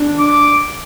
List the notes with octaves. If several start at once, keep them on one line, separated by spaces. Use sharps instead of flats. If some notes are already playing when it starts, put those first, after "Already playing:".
Already playing: D4
D6